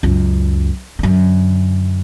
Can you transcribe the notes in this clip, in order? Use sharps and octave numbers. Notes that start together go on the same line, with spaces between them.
C#2 F#2
F#2 D3